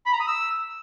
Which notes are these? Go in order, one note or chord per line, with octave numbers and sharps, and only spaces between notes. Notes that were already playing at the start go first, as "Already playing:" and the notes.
B5
A#5
D#6
E6